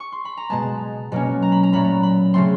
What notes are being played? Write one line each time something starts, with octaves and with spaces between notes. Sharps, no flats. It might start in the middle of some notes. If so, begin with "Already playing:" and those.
C#6
C6
B5
A#5
B2 G#3 B3 A5
B2 F#3 A#3 C#4
A#5
B5
A#5
A#2 F#3 A3 B5
A#5
B5
C#3 F#3 A3 C4 C6